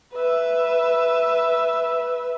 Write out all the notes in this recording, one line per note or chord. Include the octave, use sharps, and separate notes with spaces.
B4 E5